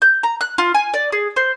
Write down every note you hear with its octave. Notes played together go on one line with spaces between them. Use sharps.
G6
A#5
F#6
F4
G#5
D5
G#4
C5